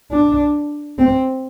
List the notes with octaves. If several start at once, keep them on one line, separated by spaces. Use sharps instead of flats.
D4
C4